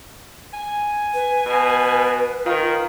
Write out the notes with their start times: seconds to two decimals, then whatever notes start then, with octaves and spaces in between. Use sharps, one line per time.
0.53 G#5
1.14 B4
1.46 B2
2.46 D#3 F4